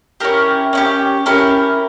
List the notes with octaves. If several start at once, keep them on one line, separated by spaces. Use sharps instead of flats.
C#4 E4 G4 A#4
C#4 E4 G4
C#4 E4 G4 A#4